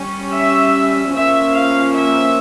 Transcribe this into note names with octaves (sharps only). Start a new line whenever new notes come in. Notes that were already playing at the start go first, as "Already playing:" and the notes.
Already playing: G3 C#4
E5
F3 A#3 C#4 E5
F5
E5